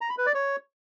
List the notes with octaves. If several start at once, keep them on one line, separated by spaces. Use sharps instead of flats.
A#5
B5
B4
D5
C#5